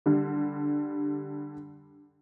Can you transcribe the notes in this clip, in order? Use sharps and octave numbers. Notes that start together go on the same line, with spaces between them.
D3 G3